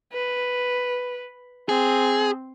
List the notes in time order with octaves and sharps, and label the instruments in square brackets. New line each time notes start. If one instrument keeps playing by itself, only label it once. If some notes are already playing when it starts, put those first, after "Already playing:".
[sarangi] B4
[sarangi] C4 [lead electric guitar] G#4